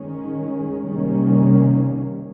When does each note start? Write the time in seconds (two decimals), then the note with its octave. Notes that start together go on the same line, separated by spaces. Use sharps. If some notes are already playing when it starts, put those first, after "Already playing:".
Already playing: D#3 G#3 C#4
0.87 C3 D#3 G3 A#3 C#4